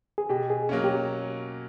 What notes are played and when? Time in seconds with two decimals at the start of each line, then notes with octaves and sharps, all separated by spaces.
0.18 G#4
0.29 B2 G4
0.50 G#4
0.69 F#3 A#3 C#4
0.84 G4